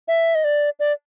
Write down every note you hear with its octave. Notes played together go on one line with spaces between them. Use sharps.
E5
D#5
D5
D5